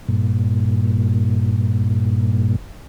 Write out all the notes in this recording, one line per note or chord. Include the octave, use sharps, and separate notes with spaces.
G2 A#2